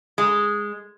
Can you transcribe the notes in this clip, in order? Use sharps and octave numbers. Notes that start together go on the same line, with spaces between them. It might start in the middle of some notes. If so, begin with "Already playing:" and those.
G#3